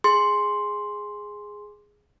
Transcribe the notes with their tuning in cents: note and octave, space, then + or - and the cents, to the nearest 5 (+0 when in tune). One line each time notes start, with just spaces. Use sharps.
G#4 +0 C6 +0